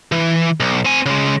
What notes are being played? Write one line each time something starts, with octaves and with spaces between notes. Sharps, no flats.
E3
B1
C4 G#5
C#3 G#3